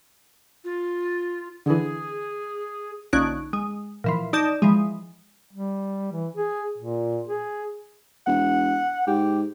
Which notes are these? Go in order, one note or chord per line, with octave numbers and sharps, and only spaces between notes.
F4
D3 E3 G#4
A#1 D3 C#4 D#4 F#6 D7
G#3
A#2 E3 F3
D#4 D5 A5 G6 E7
E3 F3 G#3
G3
E3
G#4
A#2
G#4
E1 F#5
G#2 G4